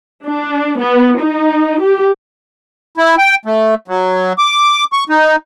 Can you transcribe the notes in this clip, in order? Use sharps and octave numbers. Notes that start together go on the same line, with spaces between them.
D4
B3
D#4
G4
E4
G5
A3
F#3
D6
C#6
D#4